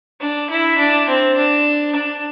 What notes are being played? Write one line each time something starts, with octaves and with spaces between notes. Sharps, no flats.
D4
E4
D4
C4
D4
D4